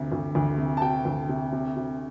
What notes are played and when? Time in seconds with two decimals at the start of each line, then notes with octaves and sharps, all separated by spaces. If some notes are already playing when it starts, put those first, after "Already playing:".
Already playing: D2 C3
0.12 D2
0.35 D2
0.58 C3
0.77 A5
0.82 C3 G5
1.05 D2
1.29 C3
1.52 C3
1.77 C3